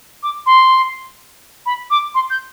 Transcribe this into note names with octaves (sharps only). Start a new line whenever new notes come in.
D6
C6
B5
D6
C6
G6